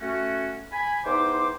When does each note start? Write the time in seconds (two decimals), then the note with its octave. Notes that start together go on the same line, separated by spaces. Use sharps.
0.01 A3 C#4 F#4
0.72 G#5 B5
1.05 E2 D#4 C5 G5 C6 D6